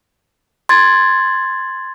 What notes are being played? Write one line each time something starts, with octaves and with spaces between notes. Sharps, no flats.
C6 G#6 A6